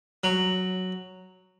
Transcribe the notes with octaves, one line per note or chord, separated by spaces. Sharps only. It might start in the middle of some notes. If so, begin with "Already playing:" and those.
F#3